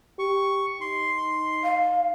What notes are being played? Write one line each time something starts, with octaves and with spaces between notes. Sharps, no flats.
G4 C#6
D#4 C6
F5